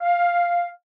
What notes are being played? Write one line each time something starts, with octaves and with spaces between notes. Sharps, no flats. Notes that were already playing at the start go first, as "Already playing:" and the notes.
F5